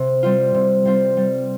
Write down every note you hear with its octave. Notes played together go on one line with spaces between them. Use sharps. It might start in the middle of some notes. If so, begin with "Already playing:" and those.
Already playing: C3
G3 C4 F4
C3
G3 C4 F4
G3